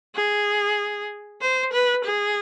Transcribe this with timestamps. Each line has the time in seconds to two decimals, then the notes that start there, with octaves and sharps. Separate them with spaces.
0.15 G#4
1.41 C5
1.73 B4
2.05 G#4